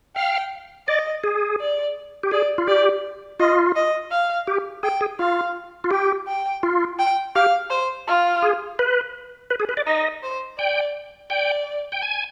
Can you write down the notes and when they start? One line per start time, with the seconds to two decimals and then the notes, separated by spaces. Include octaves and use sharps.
0.16 F5 G5
0.88 D5 D#5
1.24 G#4
1.60 D5
2.23 G4
2.31 G#4 D5
2.58 F4
2.67 G4 D5
3.40 F4 D#5
3.76 D#5
4.11 F5
4.47 G4
4.83 G#4 G5
5.01 G#4
5.19 F4 F5
5.84 F4
5.91 G4 G5
6.28 G5
6.63 F4
6.99 G5
7.35 G4 F5
7.70 C5
8.07 F4
8.42 G#4
8.79 B4
9.50 B4
9.60 G#4
9.69 B4
9.77 D5
9.87 D#4 D#5
10.23 C5
10.58 D5 G5
11.30 D5 G5
11.92 G5
12.02 G#5